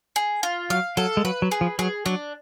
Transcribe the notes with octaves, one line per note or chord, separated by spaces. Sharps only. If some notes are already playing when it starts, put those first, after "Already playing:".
G#4
F4
F#3 F5
F#3 A4
G#3
F#3 B4
F#3
G#4
F3
F#3 G#4
F#3 D4